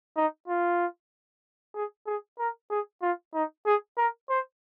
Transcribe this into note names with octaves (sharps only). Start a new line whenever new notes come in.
D#4
F4
G#4
G#4
A#4
G#4
F4
D#4
G#4
A#4
C5